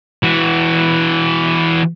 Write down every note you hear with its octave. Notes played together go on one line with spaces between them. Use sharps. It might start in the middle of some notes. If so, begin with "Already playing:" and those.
E3 F#4